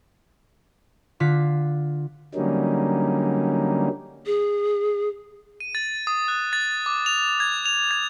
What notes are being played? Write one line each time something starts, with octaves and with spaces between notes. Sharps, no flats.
D3 F4 B6
D3 F#3 G3 A#3 C#4 D#4
G#4
D#7
A6
D#6
F#6
A6
D6
F7
G#6
F7
G#6